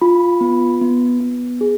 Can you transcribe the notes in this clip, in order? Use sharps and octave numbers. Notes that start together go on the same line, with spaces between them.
F4 B5
B3
B3
B3
G#4